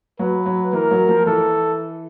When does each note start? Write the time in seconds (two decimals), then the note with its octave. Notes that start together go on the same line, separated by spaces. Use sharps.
0.19 F#3 B4
0.46 F#3
0.73 E3 A#4
0.91 F#3
1.09 F3
1.26 E3 A4